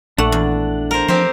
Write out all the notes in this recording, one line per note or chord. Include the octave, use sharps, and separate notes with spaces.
A#1 A3 D4 D5 F#5
E2
A#4 C5
F3 C4 G4 C5